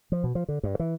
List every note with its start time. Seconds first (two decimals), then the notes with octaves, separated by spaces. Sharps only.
0.12 F3
0.24 B2
0.35 F3
0.48 D3
0.63 G2
0.79 E3